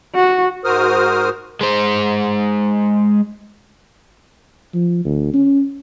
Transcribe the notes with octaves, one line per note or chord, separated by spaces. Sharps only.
F#4
G#2 F#4 A#4 C5 D#6 F6
G#3 C5
F3
D2
C#4